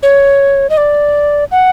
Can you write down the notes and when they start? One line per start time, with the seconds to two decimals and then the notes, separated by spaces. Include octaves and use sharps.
0.03 C#5
0.70 D#5
0.77 D5
1.52 F#5